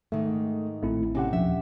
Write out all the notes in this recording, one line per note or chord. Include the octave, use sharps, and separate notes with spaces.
G#2 D#3 A3
A1 A3 C4 E4
C3 C4 C#4 G4 F#5
D#1 F3 D4 E5